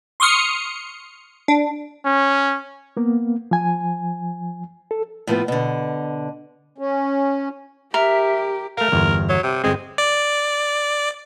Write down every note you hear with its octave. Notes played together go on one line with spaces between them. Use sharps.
C6 C#6 D#6 F6 C#7
D4
C#4
A#3 B3
F3 G#5
A4
A2 F3 B3 B4
B2 D3
C#4
G4 A#4 E5
A3 A#4 F5
G1 E2
F#3
C3
G1 G#3 C4
D5